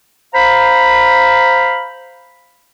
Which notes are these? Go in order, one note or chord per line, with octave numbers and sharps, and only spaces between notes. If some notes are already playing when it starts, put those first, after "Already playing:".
C5 F5 A#5 B5